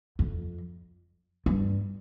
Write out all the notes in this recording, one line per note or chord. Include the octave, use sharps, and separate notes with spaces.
F2
G2